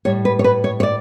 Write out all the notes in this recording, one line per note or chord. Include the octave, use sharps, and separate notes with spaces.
A2 G3 C#5
B4
C#5
B4
C#5
C#5
D5